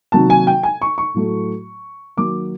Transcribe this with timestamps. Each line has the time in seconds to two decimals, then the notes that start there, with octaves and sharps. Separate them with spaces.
0.12 C3 D#3 F#3 A#3 A5
0.30 G#5
0.47 G5
0.63 G#5
0.82 C#6
0.98 C#6
1.14 A2 F#3 A3
2.17 D#3 F#3 A#3 D6